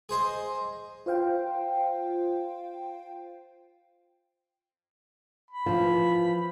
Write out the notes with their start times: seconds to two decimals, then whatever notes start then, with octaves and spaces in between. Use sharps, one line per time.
0.09 G#4 C5 D#5
1.06 F4 C5 F5 G5
5.51 B5
5.66 E3 F3